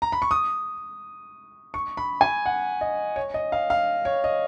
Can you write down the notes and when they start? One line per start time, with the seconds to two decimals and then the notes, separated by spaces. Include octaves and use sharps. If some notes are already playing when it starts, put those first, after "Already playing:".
0.02 A#5
0.12 B5
0.22 C#6
0.31 D#6
1.74 C#6
1.97 B5
2.21 G#5
2.46 F#5
2.81 D#5
3.16 C#5
3.34 D#5
3.52 F5
3.70 F5
4.05 C#5
4.24 D#5